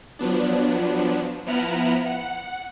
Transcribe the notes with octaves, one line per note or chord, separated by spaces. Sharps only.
F3 F#3 B3 D4
F3 B3 E4 A#5 F6 F#6
F#5